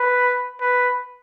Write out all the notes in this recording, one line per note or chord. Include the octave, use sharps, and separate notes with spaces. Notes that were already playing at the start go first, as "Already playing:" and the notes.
Already playing: B4
B4